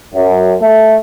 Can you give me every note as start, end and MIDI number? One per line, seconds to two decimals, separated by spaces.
0.14 0.53 42
0.61 0.96 57